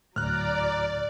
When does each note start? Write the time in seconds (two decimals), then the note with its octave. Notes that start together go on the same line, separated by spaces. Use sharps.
0.16 D2 A2 F#3 D5 A#5 F6 F#6